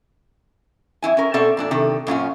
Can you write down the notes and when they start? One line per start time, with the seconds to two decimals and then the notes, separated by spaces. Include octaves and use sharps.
1.02 F2 E4 G#5
1.17 C#4 A#4
1.34 B2 C4 A4 D5 E5
1.57 F2 A#2 D4
1.71 C3 D#3 A4
2.07 F#2 A#2 C#4 F4